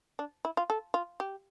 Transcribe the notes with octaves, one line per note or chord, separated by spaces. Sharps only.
D4
E4
F4
A4
F4
G4